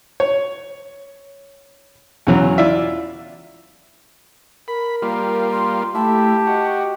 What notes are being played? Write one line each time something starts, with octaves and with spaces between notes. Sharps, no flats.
C#5
E2 C#3 E3 F#3
E4 F4 D5 E5
A#4 B5
G3 A#3 F4
C6
A3 E4 G4 A5
F#4 D#5